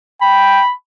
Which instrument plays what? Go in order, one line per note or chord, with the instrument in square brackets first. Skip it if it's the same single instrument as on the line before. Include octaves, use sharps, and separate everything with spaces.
[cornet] G5 [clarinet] B5